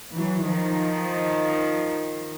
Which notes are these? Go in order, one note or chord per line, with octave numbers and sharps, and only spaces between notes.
E3 F#3
D#3 F3